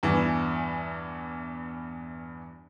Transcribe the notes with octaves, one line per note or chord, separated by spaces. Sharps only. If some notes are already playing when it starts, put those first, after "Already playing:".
E2 G2 E3